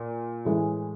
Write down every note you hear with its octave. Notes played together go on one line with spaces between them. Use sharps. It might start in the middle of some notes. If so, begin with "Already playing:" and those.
Already playing: A#2
A2 E3 G#3